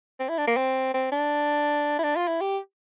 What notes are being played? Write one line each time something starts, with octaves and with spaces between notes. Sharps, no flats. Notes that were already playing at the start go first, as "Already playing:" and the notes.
C4
E4
D4
A#3
C4
C4
D4
E4
D4
F4
E4
G4